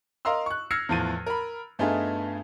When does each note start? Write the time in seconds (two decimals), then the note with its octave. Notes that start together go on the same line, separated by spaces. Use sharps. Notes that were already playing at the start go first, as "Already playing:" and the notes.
0.25 A#4 D#5 F5 A#5 C6 E6
0.46 C#6 F#6
0.71 E6 F6 G#6 A#6 C7 C#7
0.89 E2 A2 F3 A6 D#7
1.26 A#4 B5
1.79 G2 A3 B3 D#4 F4 G#4